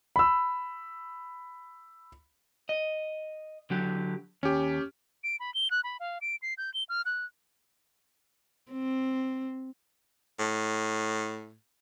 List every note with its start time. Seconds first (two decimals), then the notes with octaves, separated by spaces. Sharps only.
0.16 B5 E6
2.69 D#5
3.70 D3 F#3 G4
4.43 D#2 C#4 G4
5.24 D7
5.40 B5
5.54 G7
5.71 F#6
5.84 B5
6.00 F5
6.21 D7
6.42 C7
6.58 G6
6.74 G7
6.89 F6
7.05 F#6
8.71 C4
10.39 A2